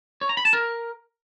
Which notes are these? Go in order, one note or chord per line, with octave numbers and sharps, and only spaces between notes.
C#5
A#5
B5
A5
A#4